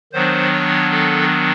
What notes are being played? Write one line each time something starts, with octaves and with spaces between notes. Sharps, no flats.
D#3 F#3 B3 D4 C5
C#5
A4